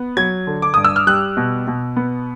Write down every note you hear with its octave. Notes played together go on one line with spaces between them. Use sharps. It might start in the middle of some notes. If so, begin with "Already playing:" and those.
Already playing: B3
F#3 G#6
D3
D6
G2 D#6
E6
F6
G3 F#6
B2
B2
B3